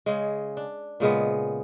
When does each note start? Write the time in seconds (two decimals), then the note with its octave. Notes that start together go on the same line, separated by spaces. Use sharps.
0.06 C#3 G#3
0.57 D4
1.00 A#2 C#3 G#3 B3